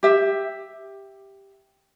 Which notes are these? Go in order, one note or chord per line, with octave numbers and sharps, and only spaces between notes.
G4 E5